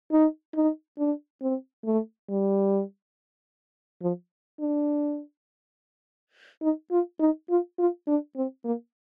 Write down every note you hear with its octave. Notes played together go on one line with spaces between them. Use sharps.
D#4
D#4
D4
C4
A3
G3
F3
D4
D#4
F4
D#4
F4
F4
D4
C4
A#3